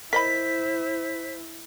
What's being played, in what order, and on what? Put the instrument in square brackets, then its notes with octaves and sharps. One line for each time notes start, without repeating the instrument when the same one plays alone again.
[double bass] E4 [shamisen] A#4 D#5 B5 [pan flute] C5 [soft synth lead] B6